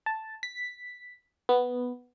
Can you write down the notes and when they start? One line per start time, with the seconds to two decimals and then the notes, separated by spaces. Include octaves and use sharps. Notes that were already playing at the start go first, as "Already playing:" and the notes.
0.06 A5
0.43 B6
1.49 B3